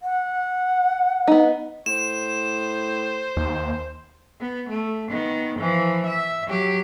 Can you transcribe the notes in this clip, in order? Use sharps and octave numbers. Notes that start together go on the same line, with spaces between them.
F#5
B3 D#4
A2 C5 E7
D#2
B3
A3
D#3 B3
E3 F3
E5
F#3 G4